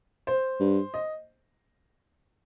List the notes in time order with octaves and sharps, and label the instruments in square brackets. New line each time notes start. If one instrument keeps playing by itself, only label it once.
[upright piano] C5
[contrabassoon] G2
[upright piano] D#5